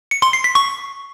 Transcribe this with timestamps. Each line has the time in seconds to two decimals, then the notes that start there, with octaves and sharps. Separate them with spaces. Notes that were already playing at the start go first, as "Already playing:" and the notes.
0.11 C#7
0.22 C6
0.33 C7
0.44 B6
0.55 C#6